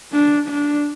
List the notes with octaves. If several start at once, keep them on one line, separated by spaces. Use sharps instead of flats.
D4
D4